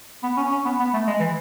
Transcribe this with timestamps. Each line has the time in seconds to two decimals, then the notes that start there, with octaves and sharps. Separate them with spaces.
0.23 B3
0.37 C#4
0.51 C#4
0.65 B3
0.79 B3
0.93 A3
1.07 G#3
1.20 E3